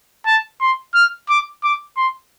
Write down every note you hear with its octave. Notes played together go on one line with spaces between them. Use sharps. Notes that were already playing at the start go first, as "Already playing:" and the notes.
A5
C6
F6
D6
D6
C6